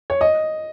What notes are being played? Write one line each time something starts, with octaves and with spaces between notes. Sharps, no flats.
C#5
D#5